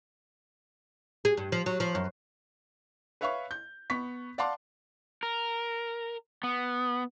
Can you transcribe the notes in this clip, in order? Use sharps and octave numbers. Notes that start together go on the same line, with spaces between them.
G#4
G2
F3
F#3
F3
F#2
B4 C#5 E5 F5 B5 C#6
G6
B3 C#6 B6
D5 F5 F#5 A5 C6 D6
A#4
B3